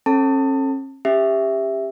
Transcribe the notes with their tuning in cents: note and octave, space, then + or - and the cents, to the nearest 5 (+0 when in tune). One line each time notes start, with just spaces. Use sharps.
C#4 -45 A4 +0 A5 +25
C#4 +0 G4 +20 E5 +0